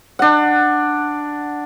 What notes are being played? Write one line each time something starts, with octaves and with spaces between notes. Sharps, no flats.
D4 F#5